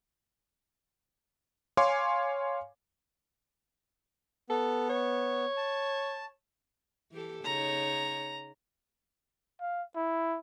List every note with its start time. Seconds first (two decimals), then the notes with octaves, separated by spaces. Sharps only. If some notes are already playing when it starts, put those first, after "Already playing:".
1.77 C#5 F5 G#5 C6 D6
4.49 B3 A4
4.89 C#5
5.57 A5
7.12 E3 G4 A4
7.44 C#3 D#4 C#5 A#5
9.60 F5
9.96 E4